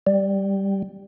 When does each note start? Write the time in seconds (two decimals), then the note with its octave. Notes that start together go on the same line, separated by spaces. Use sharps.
0.07 G3